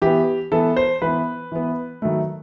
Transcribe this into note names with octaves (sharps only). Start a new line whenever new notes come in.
E3 B3 G4
E3 B3 A4
C5
E3 B3 B4
E3 B3
D#3 F#3 A3